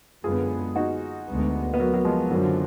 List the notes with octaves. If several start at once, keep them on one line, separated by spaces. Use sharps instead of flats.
F#2 D3 G#3 B3 F4 G#4
D#4 F#4
D2 D3 G#3 B3
B3
F#3 A#3
F#3
F3 G#3
F#2 D3 D#3 F3 F#3